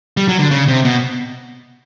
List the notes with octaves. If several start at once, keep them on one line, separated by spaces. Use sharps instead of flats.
G3
F#3
D3
C#3
C3
B2